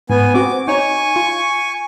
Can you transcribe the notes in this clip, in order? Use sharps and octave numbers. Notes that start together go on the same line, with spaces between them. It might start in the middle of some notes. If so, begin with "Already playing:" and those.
G#2 B3 G#5
C4 F#4 D6
D#4 C#5 G#5 C#6
F4